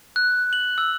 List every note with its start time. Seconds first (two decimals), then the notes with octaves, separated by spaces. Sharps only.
0.16 F#6
0.53 F#7
0.78 E6